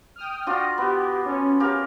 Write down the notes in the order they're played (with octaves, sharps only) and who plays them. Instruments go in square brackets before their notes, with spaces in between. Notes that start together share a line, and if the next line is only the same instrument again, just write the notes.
[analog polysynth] G5 D#6 F6
[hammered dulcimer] D4 F4 F#4
[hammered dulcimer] B3 [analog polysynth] G4
[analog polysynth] C#4
[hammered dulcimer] G4 A#4 F5